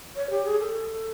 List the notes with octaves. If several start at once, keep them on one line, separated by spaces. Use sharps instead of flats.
C#5
G4
G#4
A4